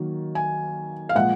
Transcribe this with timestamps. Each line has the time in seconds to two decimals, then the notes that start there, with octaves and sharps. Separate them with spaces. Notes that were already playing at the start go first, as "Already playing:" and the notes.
Already playing: D#3 F#3 A#3
0.35 G#5
1.09 F5
1.15 A#2 F3 G#3 F#5